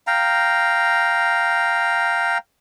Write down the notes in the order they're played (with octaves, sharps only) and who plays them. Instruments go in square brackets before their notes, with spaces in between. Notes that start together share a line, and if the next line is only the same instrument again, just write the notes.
[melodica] F5 G5 A#5